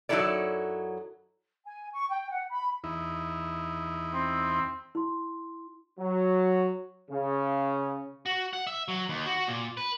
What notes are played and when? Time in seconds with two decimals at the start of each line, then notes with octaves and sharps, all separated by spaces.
0.09 F#2 F#3 D#4 E4 A4 D5
1.65 G#5
1.93 C#6
2.10 G5
2.30 F#5
2.51 B5
2.84 E2 D#4 E4
4.14 C4
4.95 E4 C6
5.99 F#3
7.10 C#3
8.26 F#4
8.53 F#5
8.67 E5
8.88 F#3
9.09 D#2
9.26 F#4
9.47 A#2
9.77 B4